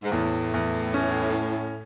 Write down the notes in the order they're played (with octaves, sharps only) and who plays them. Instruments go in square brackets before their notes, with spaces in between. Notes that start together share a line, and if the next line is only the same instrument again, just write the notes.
[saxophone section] G#2
[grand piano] E2 [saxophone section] A2
[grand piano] E2
C#4